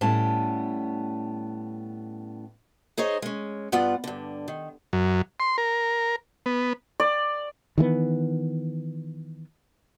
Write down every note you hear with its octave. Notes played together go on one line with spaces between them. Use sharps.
A2 G3 B3 C#4 A5
D#4 G#4 C5 C#5 D#5
G#3 C#4
G2 B3 F4 D5 F#5
G2 D3
D#3
F#2
C6
A#4
B3
D5
D#3 E3 G#3 B3